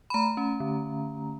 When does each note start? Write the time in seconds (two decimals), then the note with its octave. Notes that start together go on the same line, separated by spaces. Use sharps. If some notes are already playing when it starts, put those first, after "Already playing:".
0.10 B5
0.14 A3 A#5
0.37 C#4
0.60 D3